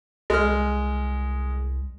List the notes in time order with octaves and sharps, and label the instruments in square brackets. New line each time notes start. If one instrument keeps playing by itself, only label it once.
[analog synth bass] C2 [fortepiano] G#3 F6